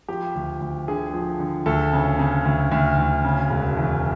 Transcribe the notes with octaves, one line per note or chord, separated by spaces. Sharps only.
F3 G4
D2
D2
D3 G#4
F3
D3
D2 A4
C#3
C#3
D2
D2
D2
C#3
E1
E2